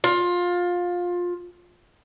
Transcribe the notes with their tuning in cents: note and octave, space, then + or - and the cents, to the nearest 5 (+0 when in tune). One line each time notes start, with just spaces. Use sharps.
F4 +20